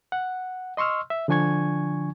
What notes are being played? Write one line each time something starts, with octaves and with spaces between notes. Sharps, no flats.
F#5
D#5 C6 C#6 E6 F6
E5
D3 F3 D4 G#5 C#6 G#6